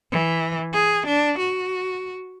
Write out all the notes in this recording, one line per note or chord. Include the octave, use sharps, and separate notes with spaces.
E3
G#4
D4
F#4